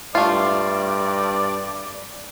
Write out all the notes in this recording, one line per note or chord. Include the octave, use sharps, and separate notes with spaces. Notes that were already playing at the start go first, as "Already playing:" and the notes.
G2 A3 F4 D5